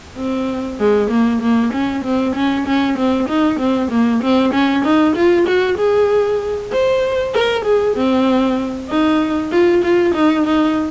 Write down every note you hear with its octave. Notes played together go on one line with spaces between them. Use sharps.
C4
G#3
A#3
A#3
C#4
C4
C#4
C#4
C4
D#4
C4
A#3
C4
C#4
D#4
F4
F#4
G#4
C5
A#4
G#4
C4
D#4
F4
F4
D#4
D#4